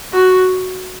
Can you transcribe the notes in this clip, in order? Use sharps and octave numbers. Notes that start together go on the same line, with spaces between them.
F#4